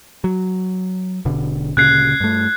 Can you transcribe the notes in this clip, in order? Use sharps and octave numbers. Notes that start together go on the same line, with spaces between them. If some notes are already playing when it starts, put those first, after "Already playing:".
F#3
E1 B2 D3
D2 A#2 C#3 F#6 G#6 C7
G2 A3